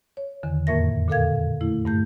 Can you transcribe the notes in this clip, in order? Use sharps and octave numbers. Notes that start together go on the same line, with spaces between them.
C#5
E2 D3 D#3
F2 A2 A#3 A#4 E5 A#6
A#2 D3 A4 A#4 F5 G#6
A3 E4
G2 A3 G6